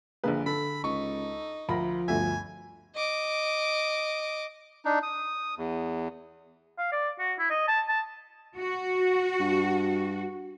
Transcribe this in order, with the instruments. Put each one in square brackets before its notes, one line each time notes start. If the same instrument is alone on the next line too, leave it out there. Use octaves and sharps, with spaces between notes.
[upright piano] A#1 D3 B4 [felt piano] A#3 G#4
[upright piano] D3 [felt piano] A4 [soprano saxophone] B5
[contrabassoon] C#2 [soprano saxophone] D#4 [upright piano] C#6
[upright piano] D2 A#4 [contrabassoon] F3 [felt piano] B5 A#6
[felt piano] G1 D2 [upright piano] E5 [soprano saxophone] G#5
[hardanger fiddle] D#5 D6
[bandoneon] D4 D#4
D#6
E2
[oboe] F5
D5
F#4
E4
D#5
A5
A5
[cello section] F#4
[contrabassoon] G2